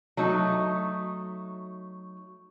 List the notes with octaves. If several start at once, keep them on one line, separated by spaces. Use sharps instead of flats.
F#3 A3 D#4